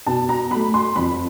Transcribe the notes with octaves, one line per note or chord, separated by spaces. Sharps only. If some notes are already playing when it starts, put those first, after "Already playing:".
B2 A5
A#5
F#3 A3 B5
C6
F2 B5